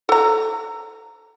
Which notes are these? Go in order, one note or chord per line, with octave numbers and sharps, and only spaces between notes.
A4 A#5